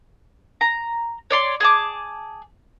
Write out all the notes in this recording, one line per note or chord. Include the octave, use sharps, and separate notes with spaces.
A#5
C#5 D5 C6
G#4 A5 D6